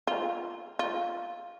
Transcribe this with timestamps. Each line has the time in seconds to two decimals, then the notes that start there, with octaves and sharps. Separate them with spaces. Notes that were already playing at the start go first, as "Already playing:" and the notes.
0.07 F4
0.79 F4